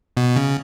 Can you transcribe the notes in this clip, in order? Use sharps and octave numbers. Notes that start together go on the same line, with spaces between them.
B2
C#3